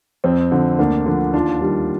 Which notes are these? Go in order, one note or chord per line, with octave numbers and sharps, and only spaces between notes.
F2 C4
D3 F3
D2 A#3 D4
D3 F3
D#2 D4 F4
D#3 G3